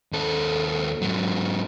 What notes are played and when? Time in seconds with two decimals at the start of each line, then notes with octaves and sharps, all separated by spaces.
0.13 D#2 A4
1.02 G#2 F#3